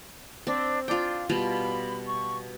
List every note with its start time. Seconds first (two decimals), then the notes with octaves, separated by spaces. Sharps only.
0.47 C4 D4
0.88 D4 F4 G5
1.29 B2 G3 F4 B5
2.07 C#6